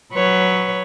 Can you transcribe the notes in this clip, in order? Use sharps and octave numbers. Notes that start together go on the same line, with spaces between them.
F#3 B4 C#5